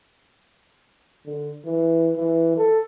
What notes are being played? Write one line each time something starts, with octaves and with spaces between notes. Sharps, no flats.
D3
E3
E3
A4